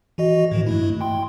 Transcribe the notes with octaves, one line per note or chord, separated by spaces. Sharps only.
E3 F#4 D#5
A2 D#3 F3
G2 A3 E4
G5 C6